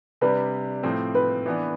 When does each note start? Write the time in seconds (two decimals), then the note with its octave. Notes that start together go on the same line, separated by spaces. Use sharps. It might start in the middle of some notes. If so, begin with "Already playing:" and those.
0.21 C3 G3 D4 B4
0.83 A2 F3 C4
1.15 B4
1.46 E3 B3 D4